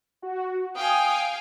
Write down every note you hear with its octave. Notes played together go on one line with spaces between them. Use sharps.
F#4
F5 G5 G#5 D#6